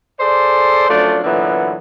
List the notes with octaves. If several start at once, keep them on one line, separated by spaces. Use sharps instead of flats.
G#4 A4 C5 D5
F#2 F3 A3 D4 D5
A#2 D3 E3 F#3 B3